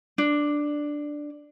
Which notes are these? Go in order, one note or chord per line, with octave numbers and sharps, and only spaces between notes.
D4